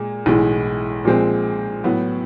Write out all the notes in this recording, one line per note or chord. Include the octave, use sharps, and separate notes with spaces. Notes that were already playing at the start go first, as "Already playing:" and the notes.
Already playing: A#2 G#3
B1 A2 E3 G#3
A#2 F3 G#3 C4
A2 F#3 B3